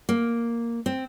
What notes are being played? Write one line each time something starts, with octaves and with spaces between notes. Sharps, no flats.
A#3
C4